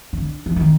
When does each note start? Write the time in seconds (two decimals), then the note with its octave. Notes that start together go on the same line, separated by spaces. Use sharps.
0.13 D3
0.46 E3
0.56 D#3